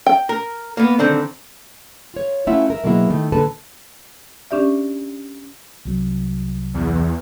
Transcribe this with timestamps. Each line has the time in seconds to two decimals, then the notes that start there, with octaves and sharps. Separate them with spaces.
0.06 G5
0.29 A#4
0.77 A#3 B3
0.99 D3 D#3 C4
2.14 F4 C#5
2.47 A3 C#4 E4 F4 E5 F#5
2.70 A#4 E5
2.84 B2 F#3 G#3 A#3 B3 E4
3.10 D#3 A3
3.32 D#2 A#2 D3 A4 B4 A5
4.51 C#4 D4 G4 D5 E5
5.85 C2 F#3
6.74 E2